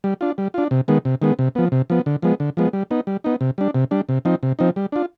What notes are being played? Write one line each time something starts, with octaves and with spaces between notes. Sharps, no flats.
G3
D4 F4
G3
D4 F4
C3
D#3 G#3 B3
C3
D#3 G#3 B3
C3
F3 B3
C3
F3 B3
D3
F3 G#3 B3
D3
F3 G#3 B3
G3
B3 D#4
G3
B3 D#4
C3
G3 D4
C3
G3 D4
C3
F3 C4 D#4
C3
F3 C4 D#4
G3
D4 F4